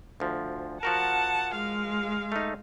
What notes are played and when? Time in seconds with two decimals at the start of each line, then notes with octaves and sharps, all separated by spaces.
0.20 D2 F3
0.83 F3 F#4 A#4 F#5 A5
1.55 G#3 F5
2.32 A3 D#4